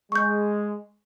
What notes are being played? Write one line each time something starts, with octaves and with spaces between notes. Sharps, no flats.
G#3 C#6 G6